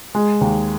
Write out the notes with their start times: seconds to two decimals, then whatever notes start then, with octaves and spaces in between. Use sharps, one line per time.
0.15 G#3
0.41 D#2